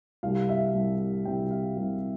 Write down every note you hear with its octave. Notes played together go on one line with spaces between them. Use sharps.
C2 C3 G3 F5
E5
C2 C3 G3
C2 C3 G3 G5
F5
C2 C3 G3